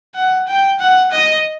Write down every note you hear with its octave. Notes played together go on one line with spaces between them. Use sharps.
F#5
G5
F#5
D#5